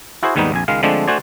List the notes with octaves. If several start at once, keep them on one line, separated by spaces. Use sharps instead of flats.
E4 F#4 G#4 C5
D#2 G#2 G3 B3 D#4
A#1 F2 G#5
C#2 D#3 G#3 F5
D3 F3 G#3 A3 C4 D4
A3 D4 F#4 C5 D5 G#5